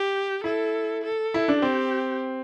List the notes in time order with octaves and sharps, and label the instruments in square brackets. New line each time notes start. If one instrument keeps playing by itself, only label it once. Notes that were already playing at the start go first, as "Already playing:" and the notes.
Already playing: [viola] G4
[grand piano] E4 [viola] A4
[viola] A4
[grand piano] E4
D4
[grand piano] C4 [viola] G4